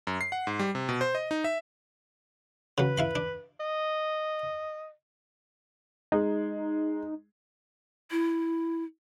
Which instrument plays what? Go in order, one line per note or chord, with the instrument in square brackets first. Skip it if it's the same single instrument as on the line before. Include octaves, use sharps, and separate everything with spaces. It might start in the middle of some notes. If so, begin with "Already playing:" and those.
[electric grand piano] F#2
C7
F#5
G#2
G3
C3
B2
C5
D#5
D#4
E5
[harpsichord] C#3 F#3 [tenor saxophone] B4
[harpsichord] E4 F5 B5
D4
[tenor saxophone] D#5
[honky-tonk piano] G#3 [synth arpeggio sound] D#4
[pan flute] E4